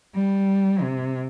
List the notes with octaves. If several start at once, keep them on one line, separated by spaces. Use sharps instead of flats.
G3
C3